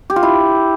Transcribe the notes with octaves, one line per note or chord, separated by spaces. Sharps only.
G4
F4
E4